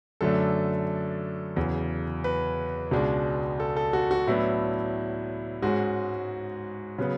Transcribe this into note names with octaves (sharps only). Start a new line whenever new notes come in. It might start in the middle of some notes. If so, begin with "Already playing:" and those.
F#2 D3 F#3 A3 D4 A4
E2 C#3 F#3
B4
C#2 B2 G#3 D4
A4
A4
F#4
F#4
A2 F#3 B3 D4 E4
G#2 G#3 C#4 F#4
C#3 F#3 B3